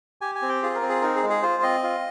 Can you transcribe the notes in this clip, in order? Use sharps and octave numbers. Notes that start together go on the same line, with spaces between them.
G4 G#5
G#5
C4
G5
F4 G#4
A#4
C4
G#4
D#4 A#4
G#4
G#3
G#4
F4 C5
C4 D#5
F4